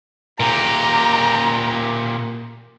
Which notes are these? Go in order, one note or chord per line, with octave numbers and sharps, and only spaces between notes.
A#2 G4 A#5